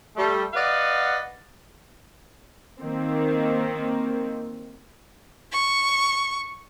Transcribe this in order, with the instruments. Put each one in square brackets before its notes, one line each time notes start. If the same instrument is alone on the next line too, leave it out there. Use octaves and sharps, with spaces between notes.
[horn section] G3 A3 A4
B4 D5 D#5 F5 F#5
[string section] D#3 A#3 C4
[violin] C#6